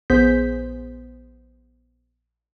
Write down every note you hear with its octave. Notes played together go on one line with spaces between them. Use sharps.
A#1 B3 G#4 C5 G6 B6